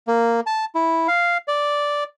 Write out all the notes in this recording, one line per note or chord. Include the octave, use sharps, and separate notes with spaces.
A#3
A5
E4
F5
D5